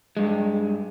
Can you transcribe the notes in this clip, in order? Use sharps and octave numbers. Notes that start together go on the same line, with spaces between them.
G2 G#3